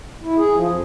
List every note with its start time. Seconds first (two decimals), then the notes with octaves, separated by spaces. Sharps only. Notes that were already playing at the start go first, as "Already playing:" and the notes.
0.23 E4
0.37 G#4
0.56 F3
0.69 F2